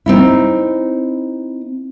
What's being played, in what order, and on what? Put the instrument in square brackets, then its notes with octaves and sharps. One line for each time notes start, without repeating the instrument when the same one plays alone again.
[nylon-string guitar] C4 D#4 E4